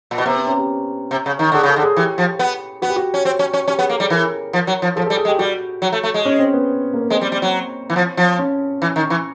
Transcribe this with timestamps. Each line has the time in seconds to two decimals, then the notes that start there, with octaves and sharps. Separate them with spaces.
0.11 A#2
0.18 B2
0.26 C3 B3
0.36 C4
0.47 C#4
0.58 G4
1.11 C3
1.26 C#3
1.39 D#3
1.52 D3 G#4
1.63 C#3
1.68 A4
1.76 D3
1.83 G#4
1.97 E3 G4
2.18 F3
2.39 B3
2.82 B3 F#4
2.90 G4
2.96 F#4
3.14 C#4
3.25 C4
3.39 C#4
3.53 C#4
3.68 C#4 G4
3.78 B3 G#4
3.89 A#3 A4
4.00 G3 G#4
4.10 E3 A#4
4.53 F3
4.67 F#3
4.82 F3
4.96 F3 A4
5.06 G3 A4
5.17 G#4
5.25 G#3
5.28 G4
5.39 G3 F#4
5.82 F#3
5.92 A3
6.03 A3
6.14 G#3
6.25 C#4
6.39 C4
6.53 B3
6.93 A#3
7.02 B3
7.10 G#3 C4
7.21 G3
7.32 G3
7.42 F#3
7.90 E3
7.96 F3
8.17 F3
8.39 C#4
8.82 E3
8.96 D#3
9.10 E3